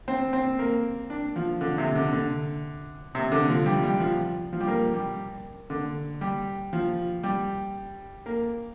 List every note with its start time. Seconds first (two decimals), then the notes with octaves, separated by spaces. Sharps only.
0.08 C4
0.33 C4
0.59 A#3
1.10 D4
1.36 F3
1.61 D3
1.78 C3
1.95 D3
2.13 D3
3.15 C3
3.32 D3
3.49 F3
3.66 G3
3.83 G3
4.00 F3
4.53 F3
4.60 G3
4.68 A#3
4.94 G3
5.70 D3
6.21 G3
6.73 F3
7.23 G3
8.26 A#3